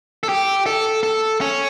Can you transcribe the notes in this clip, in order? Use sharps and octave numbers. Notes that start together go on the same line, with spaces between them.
A4
G4
A4
A4
C#4